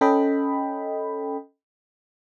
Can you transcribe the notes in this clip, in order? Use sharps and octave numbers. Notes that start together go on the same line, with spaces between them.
C#4 A4 D#5 G5 B5